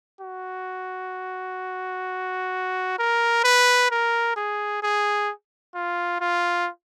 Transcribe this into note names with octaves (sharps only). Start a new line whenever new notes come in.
F#4
A#4
B4
A#4
G#4
G#4
F4
F4